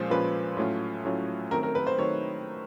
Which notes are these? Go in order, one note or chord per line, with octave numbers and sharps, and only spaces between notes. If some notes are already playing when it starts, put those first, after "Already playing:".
Already playing: A#2 F3 G#3 C#4 F4 C5
A#2 F3 G#3 C#4 F4 B4
A2 F#3 A3 C#4 F4
A2 F#3 A3 C#4 F4
D#3 F#3 A3 C4 D#4 A#4
A#4
B4
C5
D#3 F#3 A3 C4 D#4 C#5